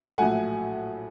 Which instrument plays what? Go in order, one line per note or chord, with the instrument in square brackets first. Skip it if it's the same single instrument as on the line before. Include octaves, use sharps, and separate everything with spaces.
[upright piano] A#1 A2 F#3 A3 F#5 G#5